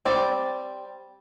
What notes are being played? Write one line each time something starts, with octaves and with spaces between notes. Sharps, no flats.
G3 C4 D5